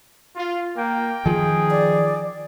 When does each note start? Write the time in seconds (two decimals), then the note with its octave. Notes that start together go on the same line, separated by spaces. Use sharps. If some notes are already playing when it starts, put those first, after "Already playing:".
0.36 F4
0.77 A#3 A#4 G5
1.26 D#3 F3 G#4
1.71 D5